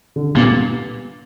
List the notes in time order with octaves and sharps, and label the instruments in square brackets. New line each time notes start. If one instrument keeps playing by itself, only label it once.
[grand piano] D3
[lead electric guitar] A#2 [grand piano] G3 B3 D4